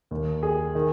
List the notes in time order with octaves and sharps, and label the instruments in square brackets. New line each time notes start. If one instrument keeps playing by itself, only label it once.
[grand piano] D#2 D#3
G#4
D#3